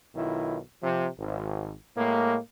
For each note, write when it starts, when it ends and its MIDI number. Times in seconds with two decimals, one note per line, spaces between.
0.15 0.57 35
0.15 0.57 51
0.15 0.57 64
0.15 0.57 65
0.82 1.07 48
0.82 1.07 53
1.18 1.72 32
1.96 2.37 45
1.96 2.37 56
1.96 2.37 58